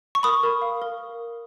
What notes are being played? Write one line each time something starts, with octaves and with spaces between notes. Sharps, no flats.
C#6
A#4 B5 D#6
A#4
F5
A#4